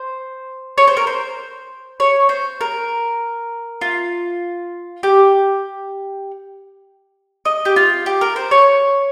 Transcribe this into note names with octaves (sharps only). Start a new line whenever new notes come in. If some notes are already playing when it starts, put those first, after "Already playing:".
Already playing: C5
C#5
C5
A#4
C5
C#5
C5
A#4
F4
G4
D#5
G4
F4
G4
A#4
C5
C#5